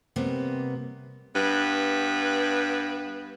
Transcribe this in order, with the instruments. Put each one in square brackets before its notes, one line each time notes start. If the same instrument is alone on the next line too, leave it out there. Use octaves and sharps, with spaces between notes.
[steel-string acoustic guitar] C3 G3 A#3 B3
[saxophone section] G2 B3 B4